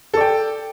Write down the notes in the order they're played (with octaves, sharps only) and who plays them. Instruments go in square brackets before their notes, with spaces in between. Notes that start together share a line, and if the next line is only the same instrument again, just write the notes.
[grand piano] A4
D5
G5